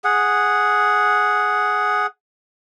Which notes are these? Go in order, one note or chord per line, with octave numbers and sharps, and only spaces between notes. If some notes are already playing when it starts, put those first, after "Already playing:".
G#4 F#5